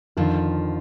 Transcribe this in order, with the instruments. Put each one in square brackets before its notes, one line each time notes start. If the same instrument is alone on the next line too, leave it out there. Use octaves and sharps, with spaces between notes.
[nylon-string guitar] F2 D3 F3 [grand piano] D#3